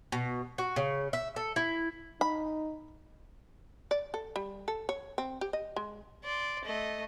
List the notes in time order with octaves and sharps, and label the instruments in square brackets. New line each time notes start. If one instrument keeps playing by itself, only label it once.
[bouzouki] B2
F#4
C#3
E5
A4
E4
[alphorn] D#4 [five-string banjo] B5
[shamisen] D5
A4
G3
A4
C#5
C4
G4
D#5
G#3
[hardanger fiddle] D5 C6
A3 D#5